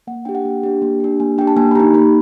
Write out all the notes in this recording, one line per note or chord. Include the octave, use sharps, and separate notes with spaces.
A#3 F#5
D4 G4 G5
F#5
A#3 G5
D4 G4
A#3
D4 G4
A#3 G#5
D4 G4 G5
A5
A#3 G#5
B5
D#4 G4 A#5
A#3 B5